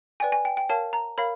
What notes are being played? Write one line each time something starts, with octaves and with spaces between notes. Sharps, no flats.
B4 D5 G5 G#5
G#5
G5
G5
A#4 C#5 F5 A5
A#5
A#4 C#5 F5 B5